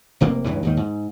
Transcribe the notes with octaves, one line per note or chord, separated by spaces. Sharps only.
F1 C3 A#3
C#2 G2 C#3 E3
D#2 G#2 D#3
G#2